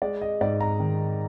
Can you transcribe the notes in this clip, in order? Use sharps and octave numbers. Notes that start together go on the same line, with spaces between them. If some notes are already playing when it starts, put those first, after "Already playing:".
G#3 D5
D#5
G#2 D5
A#5
D#3